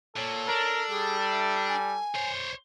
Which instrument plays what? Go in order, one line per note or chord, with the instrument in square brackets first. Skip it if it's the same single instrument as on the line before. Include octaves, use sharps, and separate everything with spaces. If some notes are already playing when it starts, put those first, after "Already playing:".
[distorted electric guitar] A#2 [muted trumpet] A4 [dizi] C#5
[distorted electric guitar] D4 [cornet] A#4
[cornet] G3 [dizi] G#4
[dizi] E5
G#5
[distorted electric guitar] C5 C#5